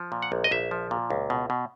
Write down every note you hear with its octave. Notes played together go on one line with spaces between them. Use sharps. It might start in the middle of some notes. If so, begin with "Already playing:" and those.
Already playing: F3
A#2
F#5
A#1
D#5
A#1 E5
F3
A#2
C#2
B2
B2